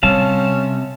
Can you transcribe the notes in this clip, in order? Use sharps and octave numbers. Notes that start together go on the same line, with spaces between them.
C3 G3 C#4 F5 A5